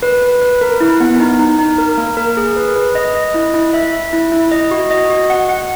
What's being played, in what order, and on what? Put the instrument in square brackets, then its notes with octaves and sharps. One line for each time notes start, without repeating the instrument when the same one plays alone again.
[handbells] B4
B4
B4
A#4
E4
B3
D#4
D#4
D#4
A#4
A#3
A#4
G#4
B4
B4
D#5
D#5
E4
E4
E5
E5
E4
E4
D#5
F#4
D#5
F#4
F#5
F#5